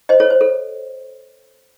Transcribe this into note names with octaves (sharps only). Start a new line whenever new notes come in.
C5 D#5
A4 C#5
C5
A4